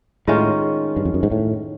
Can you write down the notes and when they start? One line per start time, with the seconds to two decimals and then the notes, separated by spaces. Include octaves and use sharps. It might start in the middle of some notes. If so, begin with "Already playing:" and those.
0.27 A2 D#3 G#3 C#4 F4
0.96 G2
1.05 F2
1.14 F#2
1.23 G#2
1.32 A2